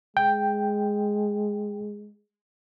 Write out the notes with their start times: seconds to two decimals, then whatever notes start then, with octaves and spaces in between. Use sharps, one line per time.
0.17 G#3 G5